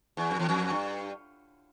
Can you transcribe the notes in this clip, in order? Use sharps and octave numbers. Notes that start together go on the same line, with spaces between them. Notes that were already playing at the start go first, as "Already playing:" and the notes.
E2
F2
E2
F2
G2